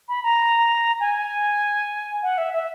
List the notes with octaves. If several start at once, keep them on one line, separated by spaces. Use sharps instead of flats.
B5
A#5
G#5
F#5
E5
E5